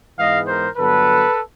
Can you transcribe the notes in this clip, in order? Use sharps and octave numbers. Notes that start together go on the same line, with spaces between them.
G#2 E3 G#3 B3 D#5 F5
A#4 C5
G2 D3 F#3 B3 A4 B4